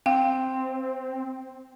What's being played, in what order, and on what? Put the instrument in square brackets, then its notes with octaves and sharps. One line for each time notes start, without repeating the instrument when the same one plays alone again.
[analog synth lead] C4 [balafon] F5 G5